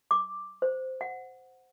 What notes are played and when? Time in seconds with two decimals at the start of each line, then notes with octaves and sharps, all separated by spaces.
0.11 D6
0.62 C5
1.01 F#5